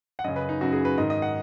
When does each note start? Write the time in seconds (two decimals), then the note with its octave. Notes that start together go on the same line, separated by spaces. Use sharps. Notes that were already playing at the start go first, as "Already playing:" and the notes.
0.19 F#5
0.24 F#2 D#5
0.28 C#3
0.36 B4
0.49 D#4
0.61 F#2 C#3 F#4
0.73 G#4
0.85 B4
0.98 G#2 D#5
1.01 D#3
1.10 D#5
1.22 F#5